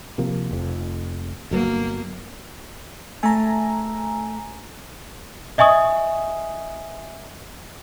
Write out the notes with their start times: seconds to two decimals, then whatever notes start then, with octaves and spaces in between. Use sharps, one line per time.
0.18 C3 F3 A#3
0.51 F1 F2
1.51 G1 F#3 A#3 B3
3.23 A3 G#5 A#5
5.58 D#5 E5 G#5 C#6 D#6